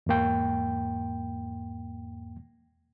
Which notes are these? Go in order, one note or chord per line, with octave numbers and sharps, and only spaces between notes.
E2 G#2 A#3 G5